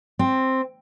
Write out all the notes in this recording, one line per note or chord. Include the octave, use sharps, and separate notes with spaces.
C4